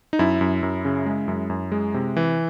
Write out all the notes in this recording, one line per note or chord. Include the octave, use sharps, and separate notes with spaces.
D#4
F#2 E4
F#2
F#2
C#3
G#3
F#2
F#2
G#3
C3
E3